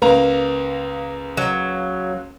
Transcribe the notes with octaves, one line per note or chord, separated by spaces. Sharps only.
C#2 A#3 B4 A#5
F#3